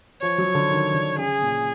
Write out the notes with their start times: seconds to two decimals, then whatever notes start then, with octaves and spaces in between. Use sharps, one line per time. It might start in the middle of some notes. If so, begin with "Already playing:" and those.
0.22 F3 C#5
0.38 F#3
0.55 D3
0.70 D#3
0.94 D3
1.18 C#3 G#4
1.42 A#2